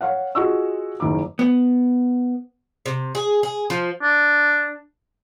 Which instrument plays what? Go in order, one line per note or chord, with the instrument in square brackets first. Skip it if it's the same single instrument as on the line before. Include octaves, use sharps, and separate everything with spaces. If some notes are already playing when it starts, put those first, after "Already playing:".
[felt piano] C#5 F5 F#5
F4 F#4 G#4 D#5 C#6 E6
F#1 D#3 E4 D6
[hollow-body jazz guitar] B3
[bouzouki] C3
G#4
G#4
F3
[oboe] D4